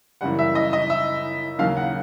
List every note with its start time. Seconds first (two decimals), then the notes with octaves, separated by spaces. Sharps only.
0.21 F#2 C#3 E3 G3 F#5
0.39 E5
0.55 D#5
0.73 D#5
0.90 E5
1.58 D#2 C#3 F#3 A#3 F5
1.77 F#5